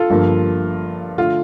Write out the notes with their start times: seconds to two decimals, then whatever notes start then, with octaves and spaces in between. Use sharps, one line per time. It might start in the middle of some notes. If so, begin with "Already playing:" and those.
Already playing: F4 A4
0.10 G1 G2 F3 A#3
1.18 D3 A3 F4